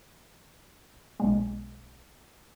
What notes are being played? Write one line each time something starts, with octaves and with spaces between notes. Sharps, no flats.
B1 A#2 G#3